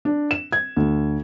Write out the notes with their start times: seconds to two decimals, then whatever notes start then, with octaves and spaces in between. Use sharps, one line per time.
0.05 D4
0.31 E7
0.52 G#6
0.77 D2